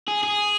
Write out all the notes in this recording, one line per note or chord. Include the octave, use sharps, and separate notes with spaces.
G#4
G#4